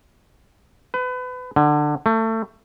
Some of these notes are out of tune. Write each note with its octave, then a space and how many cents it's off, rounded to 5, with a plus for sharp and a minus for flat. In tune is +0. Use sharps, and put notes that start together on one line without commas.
B4 +30
D3 +20
A3 +25